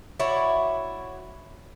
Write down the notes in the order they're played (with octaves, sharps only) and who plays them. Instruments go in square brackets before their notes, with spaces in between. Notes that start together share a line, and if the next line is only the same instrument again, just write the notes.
[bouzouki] E4 F#4 C#5 D5